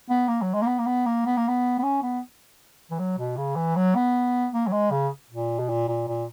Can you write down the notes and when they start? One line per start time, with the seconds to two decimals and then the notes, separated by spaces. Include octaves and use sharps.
0.09 B3
0.28 A#3
0.42 F#3
0.54 G#3
0.62 A#3
0.67 B3
0.78 A#3
0.86 B3
1.06 A#3
1.26 B3
1.37 A#3
1.48 B3
1.78 B3
1.83 C#4
2.03 B3
2.90 E3
2.99 F#3
3.18 B2
3.37 C#3
3.56 E3
3.76 F#3
3.95 B3
4.53 A#3
4.67 F#3
4.72 G#3
4.91 C#3
5.30 A#2
5.59 B2
5.69 A#2
5.88 A#2
6.07 A#2